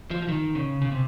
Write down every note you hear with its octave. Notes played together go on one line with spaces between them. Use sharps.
F3
F3
D#3
C#3
C#3
C3